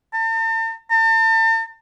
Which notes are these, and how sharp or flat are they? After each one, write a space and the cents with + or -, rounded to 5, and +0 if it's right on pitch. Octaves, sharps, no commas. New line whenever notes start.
A5 +45
A5 +40